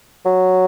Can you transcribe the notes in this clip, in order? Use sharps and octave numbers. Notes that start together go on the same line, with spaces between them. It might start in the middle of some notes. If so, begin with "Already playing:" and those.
F#3